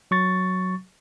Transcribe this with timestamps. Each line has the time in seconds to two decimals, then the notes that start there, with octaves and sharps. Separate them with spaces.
0.11 F#3 C#6 A6